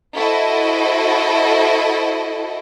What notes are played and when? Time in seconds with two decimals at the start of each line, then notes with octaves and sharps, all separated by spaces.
0.15 E4 F#4 A4 C5 D#5